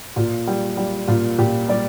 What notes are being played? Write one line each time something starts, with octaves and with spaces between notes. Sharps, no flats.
A#2 F4
G3
G3
A#2 F4
A#2 G4
G3 D5